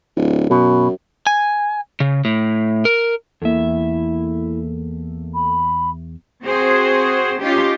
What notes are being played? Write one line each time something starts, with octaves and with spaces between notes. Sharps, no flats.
D1
F#2 B2
G#5
C#3
A2
A#4
E2 A#3 E4 A4 E5
B5
C4 F#4 G#4 C5
C#4 D#4 F4 G4